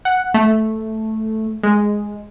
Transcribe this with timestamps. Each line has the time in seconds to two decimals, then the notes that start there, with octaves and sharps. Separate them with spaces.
0.05 F#5
0.34 A3
1.63 G#3